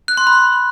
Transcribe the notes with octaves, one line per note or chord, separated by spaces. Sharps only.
F#6
C6
B5